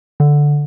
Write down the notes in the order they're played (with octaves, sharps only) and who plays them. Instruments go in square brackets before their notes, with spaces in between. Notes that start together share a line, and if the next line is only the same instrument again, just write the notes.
[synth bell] D3